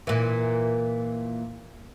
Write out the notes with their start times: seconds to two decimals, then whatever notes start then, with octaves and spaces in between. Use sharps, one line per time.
0.07 A#2 E3